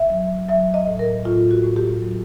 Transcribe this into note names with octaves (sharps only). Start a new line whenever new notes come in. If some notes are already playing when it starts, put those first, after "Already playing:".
Already playing: E5
F#3
F#3 E5
D#5
A2
A#4
A2 F4
F#4
A2
G4
F#3